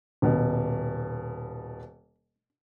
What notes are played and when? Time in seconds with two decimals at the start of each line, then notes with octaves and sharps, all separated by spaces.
0.22 D#1 B2